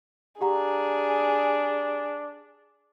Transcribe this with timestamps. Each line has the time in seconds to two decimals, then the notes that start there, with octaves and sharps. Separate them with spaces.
0.41 D4 G4 G#4 F#5 A#5